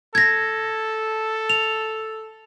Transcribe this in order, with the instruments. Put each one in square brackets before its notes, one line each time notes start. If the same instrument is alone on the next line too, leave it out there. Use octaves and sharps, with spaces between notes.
[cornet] A4 [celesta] G#6 A#6
[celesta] F7